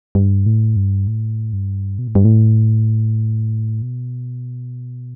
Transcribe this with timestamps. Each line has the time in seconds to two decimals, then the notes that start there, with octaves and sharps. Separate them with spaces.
0.15 G2
0.46 A2
0.76 G2
1.07 A2
1.53 G2
1.99 B2
2.07 A2
2.15 G2
2.25 A2
3.82 B2